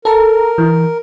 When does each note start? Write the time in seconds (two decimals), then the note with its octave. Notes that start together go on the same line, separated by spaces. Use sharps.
0.05 A4 A#4 A#5
0.58 E3